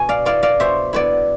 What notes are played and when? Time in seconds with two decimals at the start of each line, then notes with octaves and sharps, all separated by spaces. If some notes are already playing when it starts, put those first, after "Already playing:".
Already playing: B2 G#5
0.09 D5 F5
0.25 B3 E4 D5 F5
0.43 D5 F5
0.60 B2 C5 E5
0.93 B3 E4 B4 D5